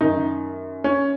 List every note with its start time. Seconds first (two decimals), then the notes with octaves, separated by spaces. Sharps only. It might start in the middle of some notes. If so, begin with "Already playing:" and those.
0.01 F#2 D#3 D#4
0.84 C#4